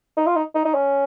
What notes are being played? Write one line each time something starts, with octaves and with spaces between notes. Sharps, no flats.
D#4
F4
D#4
D#4
D#4
C#4